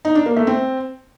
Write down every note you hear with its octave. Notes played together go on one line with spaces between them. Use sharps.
D#4
D4
A#3
A3
C4